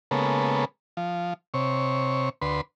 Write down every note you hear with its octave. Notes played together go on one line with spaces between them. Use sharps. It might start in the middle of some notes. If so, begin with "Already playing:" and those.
C#3 G#3 A#3 B3 A4
F3
C3 C#5
D2 B4 C6